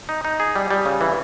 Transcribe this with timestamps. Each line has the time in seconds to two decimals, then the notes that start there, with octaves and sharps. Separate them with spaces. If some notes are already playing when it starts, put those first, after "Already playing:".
0.09 D#4
0.25 D#4
0.40 G#4
0.56 G3
0.71 G3
0.85 C#3
1.01 E3